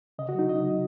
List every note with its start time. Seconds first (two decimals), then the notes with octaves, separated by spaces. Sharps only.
0.19 C#3 D#5
0.29 F#4
0.34 F#3 D#4
0.49 C#3 D#5
0.64 F#3